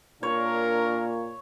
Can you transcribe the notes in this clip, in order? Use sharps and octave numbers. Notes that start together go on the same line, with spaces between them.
A#2 D4 A#4 C#5